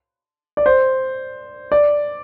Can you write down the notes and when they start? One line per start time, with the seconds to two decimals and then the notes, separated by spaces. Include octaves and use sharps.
0.57 D5
0.66 C5
1.72 D5